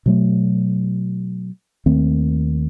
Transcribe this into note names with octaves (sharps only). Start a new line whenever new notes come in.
B2 F#3 A3
D#2 D#3 A3 C4